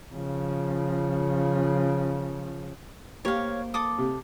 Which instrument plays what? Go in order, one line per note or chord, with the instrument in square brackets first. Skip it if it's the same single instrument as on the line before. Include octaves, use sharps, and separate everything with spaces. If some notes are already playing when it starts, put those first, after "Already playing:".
[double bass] C#3 F3
[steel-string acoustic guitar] A#3 A#4 C5 [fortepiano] G4 [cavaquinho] C#5 F5
[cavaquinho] A4 D6 D#6
[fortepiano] C3